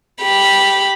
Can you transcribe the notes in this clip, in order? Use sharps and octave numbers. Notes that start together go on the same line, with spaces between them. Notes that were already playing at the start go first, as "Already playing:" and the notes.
G4 B5